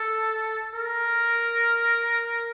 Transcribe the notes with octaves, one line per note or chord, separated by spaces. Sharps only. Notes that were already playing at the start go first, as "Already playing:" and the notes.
Already playing: A4
A#4